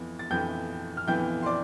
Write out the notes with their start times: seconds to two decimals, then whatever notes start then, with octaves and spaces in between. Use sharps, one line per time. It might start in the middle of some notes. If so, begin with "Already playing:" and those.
Already playing: F2 E3 B3
0.19 A6
0.31 F2 E3 B3 G5 G6
0.97 F6
1.08 F2 E3 B3 G5 G6
1.43 C6
1.46 D5 D6